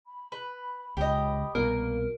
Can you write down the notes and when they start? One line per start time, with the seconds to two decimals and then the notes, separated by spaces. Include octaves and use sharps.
0.06 B5
0.32 B4
0.97 C#2 G4 D#5
1.55 C2 B2 A#3 A#4